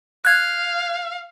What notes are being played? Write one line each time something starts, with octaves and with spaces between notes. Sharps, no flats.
F5 F#6 G#6